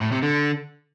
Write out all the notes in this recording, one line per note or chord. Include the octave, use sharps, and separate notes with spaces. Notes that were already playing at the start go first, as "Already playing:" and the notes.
A2
C3
D3